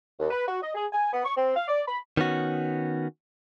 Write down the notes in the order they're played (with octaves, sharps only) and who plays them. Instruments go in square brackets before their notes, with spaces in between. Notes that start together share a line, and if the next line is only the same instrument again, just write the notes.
[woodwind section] D#2
B4
F#4
D#5
G#4
G#5
B3
C#6
C4
F5
D5
B5
[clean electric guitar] D#3 B3 C#4 F#4